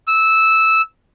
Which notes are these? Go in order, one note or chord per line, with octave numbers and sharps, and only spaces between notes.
E6